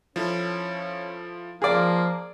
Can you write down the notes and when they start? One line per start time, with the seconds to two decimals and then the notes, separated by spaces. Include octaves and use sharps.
0.16 F3 C#4 E4 A4
1.62 F3 A#3 G#4 D5